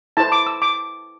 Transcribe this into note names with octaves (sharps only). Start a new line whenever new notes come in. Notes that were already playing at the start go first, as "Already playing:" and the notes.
E4 A4 C5 A5
D6
E6
D6